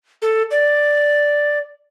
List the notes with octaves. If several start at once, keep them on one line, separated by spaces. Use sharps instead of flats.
A4
D5